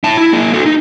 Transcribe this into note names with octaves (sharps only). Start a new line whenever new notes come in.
E4 A5
E4
A#3 G#4
F#4 A4
D#4